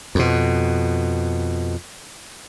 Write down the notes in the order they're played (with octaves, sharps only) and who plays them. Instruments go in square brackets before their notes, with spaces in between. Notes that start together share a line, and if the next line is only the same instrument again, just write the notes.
[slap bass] F2 B2